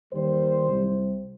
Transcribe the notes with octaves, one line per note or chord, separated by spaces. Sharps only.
D#2 D#3 G3 C5
C2 C3 G3